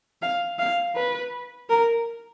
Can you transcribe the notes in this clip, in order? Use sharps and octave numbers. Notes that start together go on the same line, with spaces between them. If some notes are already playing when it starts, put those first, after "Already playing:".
F5
F5
B4
A#4